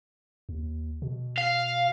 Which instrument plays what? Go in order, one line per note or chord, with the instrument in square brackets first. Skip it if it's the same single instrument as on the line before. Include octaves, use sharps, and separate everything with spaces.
[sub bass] D#2
B2
[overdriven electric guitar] F5